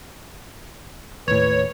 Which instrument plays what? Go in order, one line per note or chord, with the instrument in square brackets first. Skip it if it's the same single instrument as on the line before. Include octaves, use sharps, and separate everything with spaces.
[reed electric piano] D#2 A2 [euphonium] B4 [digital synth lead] C#5